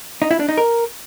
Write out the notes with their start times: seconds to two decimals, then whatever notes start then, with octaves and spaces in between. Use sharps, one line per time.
0.22 D#4
0.31 E4
0.40 D4
0.49 D#4
0.58 A#4